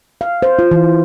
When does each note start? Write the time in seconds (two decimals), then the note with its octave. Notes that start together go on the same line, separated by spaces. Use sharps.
0.21 F5
0.42 C5
0.59 F4
0.71 E3